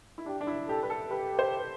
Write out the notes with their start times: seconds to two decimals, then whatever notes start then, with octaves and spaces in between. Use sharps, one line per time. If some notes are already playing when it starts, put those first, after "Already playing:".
0.18 E4
0.26 D4 G4
0.41 D4
0.47 E4
0.69 G4 A4
0.83 B4
0.90 A4
1.10 G4 B4
1.39 C5